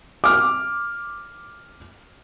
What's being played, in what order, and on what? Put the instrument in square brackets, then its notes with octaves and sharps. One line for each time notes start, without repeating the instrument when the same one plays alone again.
[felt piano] D6 F6